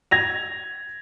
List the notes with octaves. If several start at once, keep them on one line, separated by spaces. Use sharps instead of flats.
G#6 A#6 F7